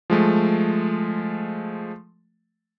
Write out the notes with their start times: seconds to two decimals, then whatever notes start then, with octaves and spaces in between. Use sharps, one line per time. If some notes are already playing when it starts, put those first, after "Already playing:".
0.10 F3 G#3 A3